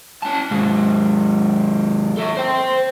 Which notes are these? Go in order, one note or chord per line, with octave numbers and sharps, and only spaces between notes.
C#4 A5
D#2 G#2
A#3 A4
C5 G5